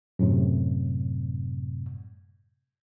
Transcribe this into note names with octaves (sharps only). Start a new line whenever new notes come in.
F#2 A2 C3